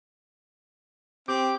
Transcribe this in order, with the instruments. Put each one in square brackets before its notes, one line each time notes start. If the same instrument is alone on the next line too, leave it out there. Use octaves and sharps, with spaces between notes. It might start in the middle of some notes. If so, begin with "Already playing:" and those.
[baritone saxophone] C4 [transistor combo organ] G4 D6